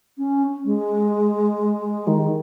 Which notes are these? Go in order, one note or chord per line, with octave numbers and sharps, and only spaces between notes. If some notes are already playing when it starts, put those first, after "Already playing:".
C#4
G#3
D#3